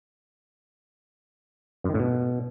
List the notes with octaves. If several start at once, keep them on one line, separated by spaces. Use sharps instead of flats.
F#2
D#3
A2
B2